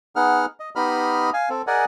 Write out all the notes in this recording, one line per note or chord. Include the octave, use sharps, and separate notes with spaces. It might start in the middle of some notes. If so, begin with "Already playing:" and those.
B3 D#4 G#4 F#5 F6
D#5
B3 D#4 G4 D#5 B5 F6
F5 G#5
C4 A4
G#4 A#4 D5 D#5 F#5 G#5